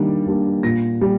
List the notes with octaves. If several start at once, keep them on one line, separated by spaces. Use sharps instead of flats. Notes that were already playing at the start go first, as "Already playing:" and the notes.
Already playing: D#3 G3 A#3 D4
G3 A#3 D4
A#2 A#6
G3